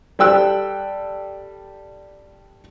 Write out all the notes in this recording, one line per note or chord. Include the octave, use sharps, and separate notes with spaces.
G3 A4 G5 E6 F#6